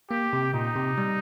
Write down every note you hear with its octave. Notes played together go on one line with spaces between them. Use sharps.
A#3 G4
C3
A#2 D#4
C3
G3